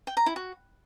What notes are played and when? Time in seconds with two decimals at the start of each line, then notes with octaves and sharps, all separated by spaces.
0.07 G5
0.17 A#5
0.26 E4
0.36 F#4